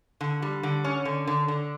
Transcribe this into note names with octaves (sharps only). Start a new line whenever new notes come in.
D3
G3
D3
C#4
D3
D3
D3